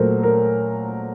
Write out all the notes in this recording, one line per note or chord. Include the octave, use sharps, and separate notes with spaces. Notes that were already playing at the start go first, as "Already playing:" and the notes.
Already playing: A#2 F#3 A3 A#4 C5
A#4